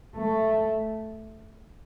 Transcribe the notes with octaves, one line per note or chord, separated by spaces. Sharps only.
A3